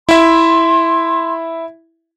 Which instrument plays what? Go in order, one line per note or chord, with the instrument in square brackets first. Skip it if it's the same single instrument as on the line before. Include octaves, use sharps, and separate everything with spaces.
[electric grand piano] E4 E5 [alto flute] C6